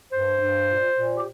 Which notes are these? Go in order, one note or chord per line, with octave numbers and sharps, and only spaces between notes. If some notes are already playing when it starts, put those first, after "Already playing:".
G2 C5
G2
A#2
A#2
G4